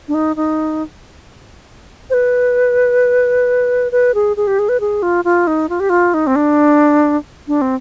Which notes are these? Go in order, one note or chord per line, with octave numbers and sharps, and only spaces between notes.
D4
D#4
D#4
C5
B4
B4
G#4
G#4
G4
G#4
B4
G#4
F4
F4
D#4
F4
G4
F4
D#4
C4
D4
D4
C4